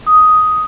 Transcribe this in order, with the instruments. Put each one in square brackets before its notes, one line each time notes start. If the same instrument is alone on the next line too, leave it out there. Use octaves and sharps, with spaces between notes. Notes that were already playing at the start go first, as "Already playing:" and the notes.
[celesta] D#6